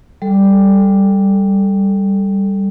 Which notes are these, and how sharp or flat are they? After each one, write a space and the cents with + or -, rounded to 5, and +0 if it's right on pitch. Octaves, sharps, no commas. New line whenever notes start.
G3 +0 A4 +0